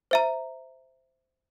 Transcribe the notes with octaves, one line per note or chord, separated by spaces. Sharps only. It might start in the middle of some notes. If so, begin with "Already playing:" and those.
C5 E5 A#5